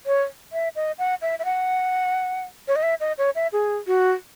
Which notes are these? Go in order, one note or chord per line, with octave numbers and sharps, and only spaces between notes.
C#5
E5
D#5
F#5
E5
E5
F#5
C#5
D#5
E5
D#5
C#5
E5
G#4
F#4